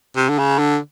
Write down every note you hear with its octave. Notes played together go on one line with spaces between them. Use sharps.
C3
D3
C#3
D3